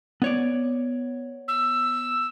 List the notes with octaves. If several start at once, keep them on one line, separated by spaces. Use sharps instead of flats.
B3 C#5 D5
E6